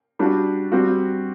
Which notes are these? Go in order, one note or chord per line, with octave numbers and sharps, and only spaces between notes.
G3 D4 F#4
G3 C4 F#4